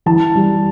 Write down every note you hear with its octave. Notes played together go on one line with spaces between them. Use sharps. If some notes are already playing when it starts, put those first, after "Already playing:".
E3 A5
G3